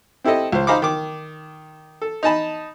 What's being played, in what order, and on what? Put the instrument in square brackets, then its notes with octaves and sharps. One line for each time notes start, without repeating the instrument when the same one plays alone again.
[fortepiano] C4 E4 G4 A4 D#5
C#2 C5
D#4 C5 F5 A#5 B5 D6
D#3 D6
A4
D#4 D#5 A5 B5